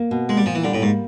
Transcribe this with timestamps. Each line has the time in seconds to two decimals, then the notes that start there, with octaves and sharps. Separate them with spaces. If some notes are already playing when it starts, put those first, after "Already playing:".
Already playing: A#3
0.11 B2
0.29 G#3 A#3
0.37 G3
0.46 A#2 F3
0.55 E3
0.64 D3 G3
0.74 A2
0.82 G#2 A#3